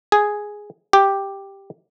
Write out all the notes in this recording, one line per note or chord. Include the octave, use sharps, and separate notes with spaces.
G#4
G4